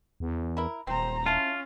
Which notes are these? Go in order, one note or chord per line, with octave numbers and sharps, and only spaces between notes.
E2
E4 A#4
D#1 C4 C5 A#5
C#4 E4 F4 A5